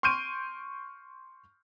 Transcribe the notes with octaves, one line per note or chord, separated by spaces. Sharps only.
C6 C#6 F6 G6 D7 D#7